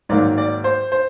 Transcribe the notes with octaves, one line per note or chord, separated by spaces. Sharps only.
G#2 D#3 F#3 A#3 D5
D5
C5
C5